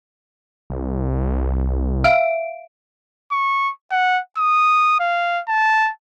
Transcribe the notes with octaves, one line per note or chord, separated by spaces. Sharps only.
C2
E5 F5 D7
C#6
F#5
D#6
F5
A5